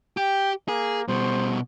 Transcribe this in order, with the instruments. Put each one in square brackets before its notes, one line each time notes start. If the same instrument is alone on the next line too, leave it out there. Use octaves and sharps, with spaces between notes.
[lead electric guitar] G4 [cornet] G5
[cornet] A#3 [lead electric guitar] G#4
[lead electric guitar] B2 G3 [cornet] C5